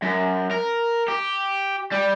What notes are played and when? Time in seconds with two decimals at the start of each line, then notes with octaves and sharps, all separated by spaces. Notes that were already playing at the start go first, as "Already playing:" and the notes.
0.02 F#2
0.51 A#4
1.08 G4
1.92 G3